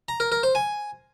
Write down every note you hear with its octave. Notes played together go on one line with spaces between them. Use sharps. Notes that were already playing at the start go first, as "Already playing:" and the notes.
A#5
A#4
A#4
C5
G#5